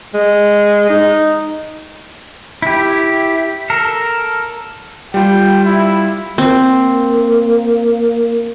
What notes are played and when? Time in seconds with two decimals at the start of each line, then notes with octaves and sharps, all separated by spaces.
0.14 G#3
0.90 D#4
2.62 E4 G4
3.70 A4 A#4
5.14 G3 F4 G5
5.65 E4
6.38 A#3 C4